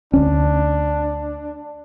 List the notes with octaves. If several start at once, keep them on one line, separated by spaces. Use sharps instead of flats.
D2 C#4 D4